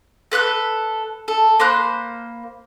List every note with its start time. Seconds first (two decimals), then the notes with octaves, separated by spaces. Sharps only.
0.32 A4 B4 D6 F#6
1.28 A4
1.60 A#3 C5 B5 F#6